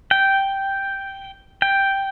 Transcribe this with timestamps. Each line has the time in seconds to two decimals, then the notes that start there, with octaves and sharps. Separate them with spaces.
0.11 G5
1.62 G5